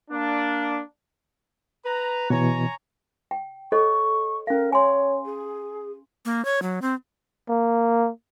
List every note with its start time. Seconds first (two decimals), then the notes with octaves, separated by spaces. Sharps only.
0.10 A#3 D4
1.85 B4 A#5
2.30 B2 E3 C#5 G#5 A#5
3.31 G5
3.72 A4 C#5 D#5 C#6
4.47 C#4 A#4 F5
4.72 C#5 G#5 C6
5.25 G#4
6.25 A#3
6.45 C#5
6.62 F#3
6.82 C4
7.49 A#3